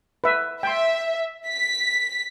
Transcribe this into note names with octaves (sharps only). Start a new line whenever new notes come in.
B4 E5
E5 G5 C6
B6